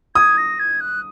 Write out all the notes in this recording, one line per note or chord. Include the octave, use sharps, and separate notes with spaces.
D#6 G#6
A#6
G#6
F#6